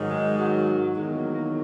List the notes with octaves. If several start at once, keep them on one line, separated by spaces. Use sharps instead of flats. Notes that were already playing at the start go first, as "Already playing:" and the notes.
Already playing: G#2 D#3 F#3
G#3
F#3
E2 D#3 F#3 G#3
A#3
A#3